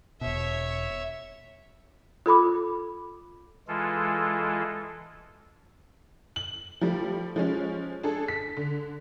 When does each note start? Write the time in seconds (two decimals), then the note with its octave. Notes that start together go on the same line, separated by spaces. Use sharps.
0.21 E1 B2 C#5 E5
2.26 F4 A4 B5 D6
3.68 E3 G#3 F4 A4
6.36 F#7
6.81 F3 G3 A3
7.36 F3 G#3 C#4
8.03 D4 G#4 A4
8.28 B6
8.57 D3